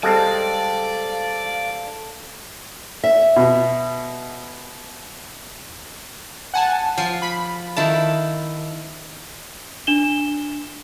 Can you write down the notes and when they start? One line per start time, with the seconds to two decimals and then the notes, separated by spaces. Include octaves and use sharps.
0.03 G3 G#3 C4 A4 D5 F5
3.04 E5
3.36 B2
6.54 F#5 G#5 A5
6.98 F3 C7
7.22 B5
7.77 D#3 E4 A5
9.87 D4 E7 G7